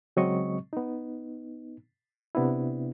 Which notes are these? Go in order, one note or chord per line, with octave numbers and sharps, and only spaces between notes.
C#3 F#3 G#3 C4 D#5 C#6
B3 D#4
C3 B3 D4 E4